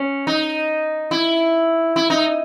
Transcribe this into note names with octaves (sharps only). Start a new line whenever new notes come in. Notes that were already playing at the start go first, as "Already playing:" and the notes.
Already playing: C#4
D#4
E4
E4
D#4